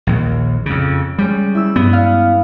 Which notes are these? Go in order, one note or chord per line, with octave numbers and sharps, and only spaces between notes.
A#1 D#2
F2 C#3
G3 G#3 C#4
E4 E6
G2 B3
F5